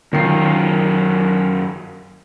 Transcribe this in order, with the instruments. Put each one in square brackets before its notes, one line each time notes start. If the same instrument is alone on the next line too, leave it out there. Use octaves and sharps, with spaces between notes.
[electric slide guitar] F#2 F4 [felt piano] D#3 C7